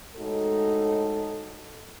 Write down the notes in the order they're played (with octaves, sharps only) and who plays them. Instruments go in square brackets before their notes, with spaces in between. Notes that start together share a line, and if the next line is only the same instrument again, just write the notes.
[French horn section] A2 G#3 D#4 F#4 A4